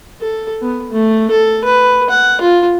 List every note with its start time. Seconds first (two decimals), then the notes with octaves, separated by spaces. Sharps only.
0.21 A4
0.62 B3
0.91 A3
1.31 A4
1.64 B4
2.10 F#5
2.41 F4